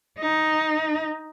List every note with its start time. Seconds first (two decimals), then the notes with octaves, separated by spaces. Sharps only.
0.19 D#4